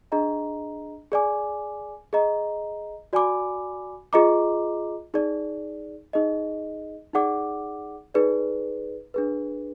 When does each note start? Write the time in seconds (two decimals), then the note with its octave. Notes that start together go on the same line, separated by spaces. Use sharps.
0.12 D4 G#4 D#5 A#5
1.12 G#4 D5 G#5 D6
2.13 G#4 D#5 A#5
3.13 F#4 D5 G#5 B5 D6
4.13 F4 G#4 D#5 A#5 D6
5.14 D#4 G#4 D5
6.13 D#4 G#4 D#5
7.14 D#4 G#4 D5 F#5 D6
8.14 D#4 G#4 B4 D5
9.14 D4 G#4 B4